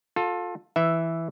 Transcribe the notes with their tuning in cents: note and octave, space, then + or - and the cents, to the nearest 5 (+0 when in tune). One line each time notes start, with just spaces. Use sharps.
F4 +25 A4 +0
E3 +0 E5 +0